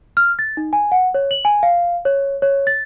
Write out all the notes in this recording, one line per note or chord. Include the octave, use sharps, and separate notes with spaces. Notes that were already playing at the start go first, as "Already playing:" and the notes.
F6
A6
D#4
G#5
F#5
C#5
F#7
G#5
F5
C#5
C#5
A6